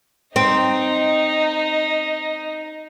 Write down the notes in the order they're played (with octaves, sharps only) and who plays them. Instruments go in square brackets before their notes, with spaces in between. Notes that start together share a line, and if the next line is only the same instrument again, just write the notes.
[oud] C4 [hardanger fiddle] D#4 D#5